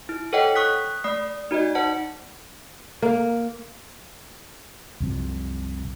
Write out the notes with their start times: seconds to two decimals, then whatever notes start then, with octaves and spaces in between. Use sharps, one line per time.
0.09 E4
0.33 A4 C5 C#5 D#5 F#5 G5
0.55 C#6 D#6 F#6 B6
1.04 A3 D5 D#6 C7
1.51 D#4 F#4 D5 D#5
1.75 C5 F#5 A5
3.02 A#3
5.00 C2 F#2 C3 F3